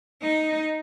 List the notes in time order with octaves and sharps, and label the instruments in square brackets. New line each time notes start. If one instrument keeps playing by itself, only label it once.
[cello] D#4